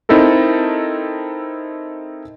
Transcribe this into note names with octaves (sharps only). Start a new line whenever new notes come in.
C4 D#4 E4 A4 A#4